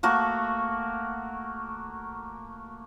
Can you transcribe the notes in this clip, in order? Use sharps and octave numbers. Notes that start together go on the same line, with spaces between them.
A3 A#3 F#4 C#6